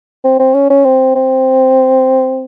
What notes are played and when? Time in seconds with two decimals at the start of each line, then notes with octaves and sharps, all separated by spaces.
0.24 C4
0.39 C4
0.54 C#4
0.70 C#4
0.85 C4
1.15 C4